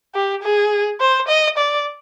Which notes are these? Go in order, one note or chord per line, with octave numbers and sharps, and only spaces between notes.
G4
G#4
C5
D#5
D5